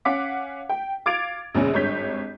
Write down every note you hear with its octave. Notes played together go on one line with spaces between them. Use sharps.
C#4 F5 F#5 D6 B6
G5
F5 D6 G#6 A6 D7 F7
A#1 E2 C#3 G#3 C#4
G#1 G2 C#5 G6 B6